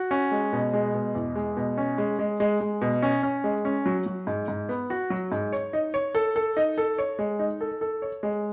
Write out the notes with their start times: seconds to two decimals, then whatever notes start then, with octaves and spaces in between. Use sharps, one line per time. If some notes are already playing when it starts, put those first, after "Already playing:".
Already playing: F#4
0.11 C#4
0.32 G#3
0.53 B2
0.73 G#3
0.94 B2
1.15 E2
1.36 G#3
1.57 B2
1.78 C#4
1.98 G#3
2.19 G#3
2.40 G#3
2.60 G#3
2.81 B2
3.02 C#4
3.23 C#4
3.44 G#3
3.65 C#4
3.86 F#3
4.06 F#3
4.27 G#2
4.48 G#2
4.69 B3
4.90 F#4
5.10 F#3
5.32 G#2
5.53 C#5
5.73 D#4
5.94 C#5
6.15 A4
6.36 A4
6.57 D#4
6.78 A4
6.98 C#5
7.19 G#3
7.39 D#4
7.61 A4
7.81 A4
8.02 C#5
8.23 G#3